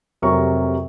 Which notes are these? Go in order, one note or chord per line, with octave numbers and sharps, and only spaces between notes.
F1 C3 F#3 A#4 C#6